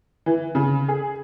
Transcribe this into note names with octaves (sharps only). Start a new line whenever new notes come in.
E3
C#3
G#4